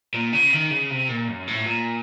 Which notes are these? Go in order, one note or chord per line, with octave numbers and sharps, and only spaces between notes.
A#2
C#3
D#3
C#3
C3
A#2
F#2
A2
A#2